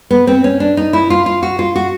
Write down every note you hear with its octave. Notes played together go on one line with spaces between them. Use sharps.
B3
C4
C#4
D4
D#4
E4
F4
F4
F#4
F4
F#4